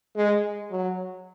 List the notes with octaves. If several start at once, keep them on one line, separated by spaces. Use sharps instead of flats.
G#3
F#3